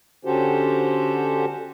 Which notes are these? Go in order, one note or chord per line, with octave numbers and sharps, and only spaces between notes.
D3 C#4 F#4 G4 A4 C5